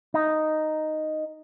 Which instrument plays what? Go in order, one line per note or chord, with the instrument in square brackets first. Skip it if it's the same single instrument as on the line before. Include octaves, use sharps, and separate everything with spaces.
[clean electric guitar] D#4